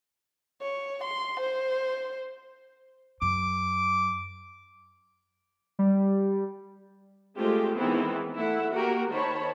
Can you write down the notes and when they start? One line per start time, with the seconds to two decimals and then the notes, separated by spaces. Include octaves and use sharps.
0.62 C#5
1.04 C6
1.40 C5
3.22 F#2 D6
5.79 G3
7.37 G#3 A3 C4 F4 G4
7.76 D#3 E3 G#3 B3 C4 E4
8.36 A3 E4 E5 F#5
8.74 A#3 F#4 G4 A#4 F#5
9.12 D#3 C5 C#5 A5 B5